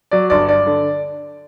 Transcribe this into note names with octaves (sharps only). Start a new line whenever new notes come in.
F#3 D5
G1 D5
G2 D5
D3